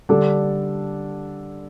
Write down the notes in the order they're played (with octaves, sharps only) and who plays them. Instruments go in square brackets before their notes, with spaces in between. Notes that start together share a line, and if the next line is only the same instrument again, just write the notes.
[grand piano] D3 G3 D4 A4